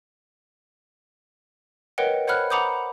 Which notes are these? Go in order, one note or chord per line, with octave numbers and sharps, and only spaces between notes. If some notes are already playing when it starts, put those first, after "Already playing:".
A#4 B4 C#5 D#5 F#5 G5
C5 C#5 F#5 B5 F6 F#6
F#5 A#5 B5 D6 D#6 G6